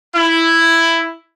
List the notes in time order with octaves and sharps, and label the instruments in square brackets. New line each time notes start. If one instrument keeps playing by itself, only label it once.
[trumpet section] E4